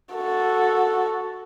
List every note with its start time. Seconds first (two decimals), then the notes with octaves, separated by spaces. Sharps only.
0.14 F#4 A4